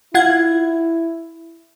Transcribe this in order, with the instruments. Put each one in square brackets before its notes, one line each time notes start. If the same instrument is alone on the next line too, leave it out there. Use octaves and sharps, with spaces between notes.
[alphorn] E4 [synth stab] F4 F#5 G#6